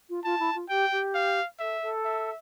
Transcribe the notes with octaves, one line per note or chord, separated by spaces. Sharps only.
F4
F4 A5
E4
F4
G4 G5
G4
F5
A4 E5
A4
E5